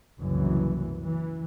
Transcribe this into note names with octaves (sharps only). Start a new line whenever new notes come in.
F#1 C2 F#2 E3
E3